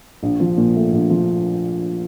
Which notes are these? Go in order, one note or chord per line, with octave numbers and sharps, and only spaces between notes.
A#1
F3
A#2
A3
A#1
F3